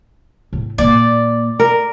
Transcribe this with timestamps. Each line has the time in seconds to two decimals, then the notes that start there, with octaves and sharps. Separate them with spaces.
0.53 A2
0.78 A#2 A#3 D5
1.60 A#4